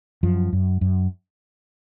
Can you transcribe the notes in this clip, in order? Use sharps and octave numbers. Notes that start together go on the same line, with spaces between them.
F#2 F3
F#2
F#2